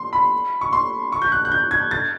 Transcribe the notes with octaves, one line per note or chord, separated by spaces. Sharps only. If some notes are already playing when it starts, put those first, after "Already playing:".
Already playing: C6
B5
C#6
C6
C#6
G6
F#6
F#6
G6
G#6
A6